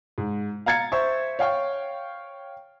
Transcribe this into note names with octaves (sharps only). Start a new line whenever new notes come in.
G#2
F5 A#5 G#6 A6 C#7
C5 E5 C#6
C#5 F5 G5 C#6